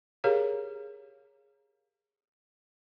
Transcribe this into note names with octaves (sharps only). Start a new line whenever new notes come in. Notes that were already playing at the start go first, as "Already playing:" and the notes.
G4 G#4 A#4 C#5 F5 A#5